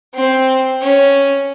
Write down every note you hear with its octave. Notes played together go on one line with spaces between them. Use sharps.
C4
C#4